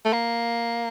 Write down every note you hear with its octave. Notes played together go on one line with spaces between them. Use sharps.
A3
A#3